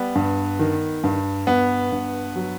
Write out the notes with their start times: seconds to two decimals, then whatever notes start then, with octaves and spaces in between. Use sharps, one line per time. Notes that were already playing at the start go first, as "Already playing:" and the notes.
Already playing: G3 B3
0.15 G2
0.59 D#3
1.04 G2
1.47 G2 B3
1.92 G2
2.36 F#3